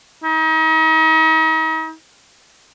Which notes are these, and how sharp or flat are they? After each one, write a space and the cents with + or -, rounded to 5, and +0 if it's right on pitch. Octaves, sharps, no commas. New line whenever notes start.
D#4 +40